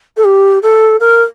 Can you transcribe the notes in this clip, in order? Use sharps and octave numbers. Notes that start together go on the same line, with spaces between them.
A4
G4
A4
A#4